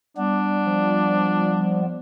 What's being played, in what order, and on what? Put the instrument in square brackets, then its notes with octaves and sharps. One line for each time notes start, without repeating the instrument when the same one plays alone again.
[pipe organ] G3 B3 [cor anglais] D4
[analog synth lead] F3